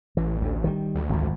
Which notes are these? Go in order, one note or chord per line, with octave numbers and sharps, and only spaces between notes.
A1 E3
D2
D#3 G3
D2
G#1 F2